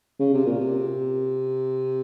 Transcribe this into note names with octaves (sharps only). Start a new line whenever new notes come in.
C#3
C3
A#2
C3